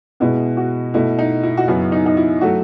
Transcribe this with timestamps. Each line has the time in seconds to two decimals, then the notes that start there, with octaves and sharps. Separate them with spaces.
0.20 B2 G#3 B3 E4
0.57 F#4
0.94 B2 A3 E4
1.19 D#4
1.43 E4
1.57 F#4
1.68 F#2 C#3 F#3 B3 E4
1.92 D#4
2.06 D#4
2.17 E4
2.41 F#3 A3 F#4